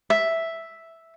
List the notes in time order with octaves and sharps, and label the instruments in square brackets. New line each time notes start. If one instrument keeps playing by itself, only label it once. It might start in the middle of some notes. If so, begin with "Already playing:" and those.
[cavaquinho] E5